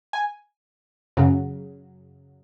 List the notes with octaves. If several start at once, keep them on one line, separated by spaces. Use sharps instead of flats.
G#5
F#2 C#3 F#3